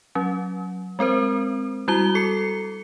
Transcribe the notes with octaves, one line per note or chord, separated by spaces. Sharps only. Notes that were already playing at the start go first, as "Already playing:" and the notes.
F#3 C#4
G#3 C4 A#4 C5
G3 E4 F#4 A#5 G7
A4 C7 C#7